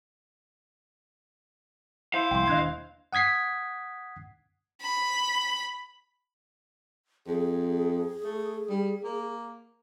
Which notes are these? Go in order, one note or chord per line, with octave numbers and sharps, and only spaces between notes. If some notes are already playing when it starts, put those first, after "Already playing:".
E4 C5 F5
C2 F2 A2 G5 C6
E1 D#2 D4 D#5 F#6 G#6
F#5 D#6 G#6 B6 C7
B5
F2 G#4
A3
G3
A#3